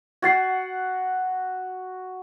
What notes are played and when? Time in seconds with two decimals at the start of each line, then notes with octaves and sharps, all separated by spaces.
0.22 F#4 F#5 G#6 A6 C7